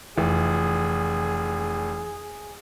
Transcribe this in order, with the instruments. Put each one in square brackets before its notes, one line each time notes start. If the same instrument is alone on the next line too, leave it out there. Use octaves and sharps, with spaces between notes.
[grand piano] F1 [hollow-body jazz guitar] E3 [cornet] G#4